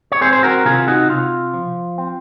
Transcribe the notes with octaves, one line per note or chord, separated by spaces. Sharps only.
C#5
C4 G#4 C5
C5
F#4 A#4
C3 F4 G#4
D#4 F#4
C3 F4
F3
C4